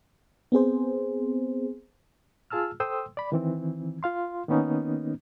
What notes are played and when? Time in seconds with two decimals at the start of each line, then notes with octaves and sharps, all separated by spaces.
0.52 B3 C4 G#4 C5
2.50 F4 G#4 A5 E6 F6
2.80 A4 C5 G5 C6 D#6 E6
3.17 D5 B5
3.32 D#3 E3 C4
4.03 F4 F5 C6
4.48 D#3 A#3 B3 C#4 D#4